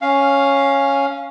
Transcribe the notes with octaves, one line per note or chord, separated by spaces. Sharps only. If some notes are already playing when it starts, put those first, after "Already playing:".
C#4 F5